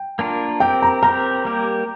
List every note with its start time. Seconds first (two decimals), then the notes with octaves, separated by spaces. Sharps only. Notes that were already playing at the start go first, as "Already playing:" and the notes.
Already playing: G5
0.19 A#3 D4 F4 A#4
0.60 C4 G4 A#4 G5
0.82 A#5
1.03 C4 G4 A#4 A#5
1.45 G3 A#3 G4 A#4